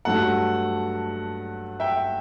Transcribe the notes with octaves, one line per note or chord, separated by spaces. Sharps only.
G2 F#3 A3 F#5 A5
E5 G5